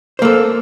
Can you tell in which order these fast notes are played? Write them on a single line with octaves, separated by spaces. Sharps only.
C5 A#3 A4